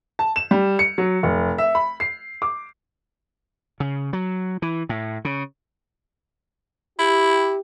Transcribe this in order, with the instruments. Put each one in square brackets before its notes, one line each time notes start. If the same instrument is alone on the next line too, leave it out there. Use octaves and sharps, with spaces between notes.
[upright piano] A5
E7
G3
C#7
F#3
F1
E5
B5
C7
D6
[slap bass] C#3
F#3
E3
A2
C#3
[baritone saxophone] E4 [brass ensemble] G4